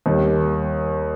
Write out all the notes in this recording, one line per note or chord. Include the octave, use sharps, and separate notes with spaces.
D#2 D#3 G3